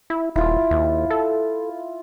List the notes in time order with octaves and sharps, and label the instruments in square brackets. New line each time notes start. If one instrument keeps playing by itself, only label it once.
[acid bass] E4
[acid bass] D#1 [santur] E4 F4
[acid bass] D#2
A4